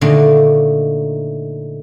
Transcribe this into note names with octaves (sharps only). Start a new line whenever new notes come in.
A#2 D3 D#3 A3 A#3 F#4